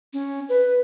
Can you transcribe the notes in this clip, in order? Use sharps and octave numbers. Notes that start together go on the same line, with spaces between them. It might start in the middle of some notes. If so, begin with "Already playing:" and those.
C#4
B4